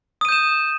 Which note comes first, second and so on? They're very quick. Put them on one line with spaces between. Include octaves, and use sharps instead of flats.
D#6 D#7 G6 E7